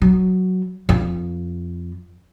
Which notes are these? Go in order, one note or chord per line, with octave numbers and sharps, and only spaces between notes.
F#3
F2